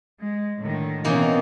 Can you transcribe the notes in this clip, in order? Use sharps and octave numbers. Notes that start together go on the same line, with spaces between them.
G#3
A2 D3 D#3
B2 E3 A#3 C4 C#4 D#4